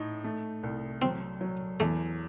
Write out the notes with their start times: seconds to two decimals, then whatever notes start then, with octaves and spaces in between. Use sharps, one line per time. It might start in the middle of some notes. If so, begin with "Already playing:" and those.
Already playing: A2 D#4
0.24 A3
0.63 C2
1.02 F#3 C4
1.41 F#3
1.80 E2 A3